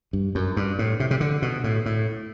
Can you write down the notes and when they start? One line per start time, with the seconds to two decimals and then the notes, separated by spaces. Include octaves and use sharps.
0.13 G2
0.35 F#2
0.57 G2
0.79 A2
1.00 C3
1.11 C3
1.20 D3
1.42 B2
1.64 A2
1.86 A2